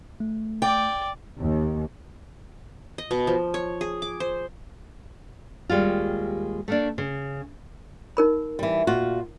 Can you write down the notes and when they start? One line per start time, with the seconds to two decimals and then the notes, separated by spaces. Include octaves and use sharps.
0.20 A3
0.62 D5 G5
1.41 D#2
2.98 D#5
3.11 B2
3.27 F3
3.54 C#5
3.81 G#4
4.02 D6
4.20 C5
5.69 D#2 G3 G#3 F4
6.68 A3 A#3 D4
6.98 C#3
8.17 D#4 A#4 B5
8.59 E3 G3
8.87 A#2 F4 F#4